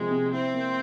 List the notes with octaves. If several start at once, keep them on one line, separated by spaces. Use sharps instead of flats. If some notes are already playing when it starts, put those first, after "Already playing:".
Already playing: C3 F3 G#3 A#3
C3
C4 E4
A#3